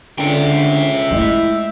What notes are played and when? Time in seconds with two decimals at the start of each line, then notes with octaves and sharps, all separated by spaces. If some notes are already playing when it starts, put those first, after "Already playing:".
0.18 C#2 D3 E5 G5
1.11 G#3 A3 E4 D#5